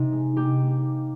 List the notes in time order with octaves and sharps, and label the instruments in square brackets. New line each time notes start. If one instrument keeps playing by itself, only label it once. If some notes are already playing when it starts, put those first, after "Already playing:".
Already playing: [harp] C3 D#4
G#3
A#3 D#4 G4
A#3